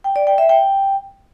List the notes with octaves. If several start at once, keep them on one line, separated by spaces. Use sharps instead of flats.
G5
D5
G5
E5
G5